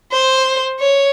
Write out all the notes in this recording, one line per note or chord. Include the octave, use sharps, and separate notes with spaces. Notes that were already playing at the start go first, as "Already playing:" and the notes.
C5
C#5